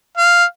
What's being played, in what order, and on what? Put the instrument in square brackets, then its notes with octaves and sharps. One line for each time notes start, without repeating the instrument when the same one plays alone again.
[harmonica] F5